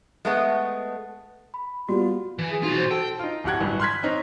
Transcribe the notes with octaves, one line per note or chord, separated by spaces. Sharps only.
G#3 A3 B3
B5
G3 B3 F4 F#4
E3
G#4
B1 D#4 F4 F#4
C5
A4 G5
D#4 F4
D1 A2 G4 F#5 F#6 G#6
A1 G2 E3 F#3
C6 F6 F#6 G#6 B6
C4 D#4 C#5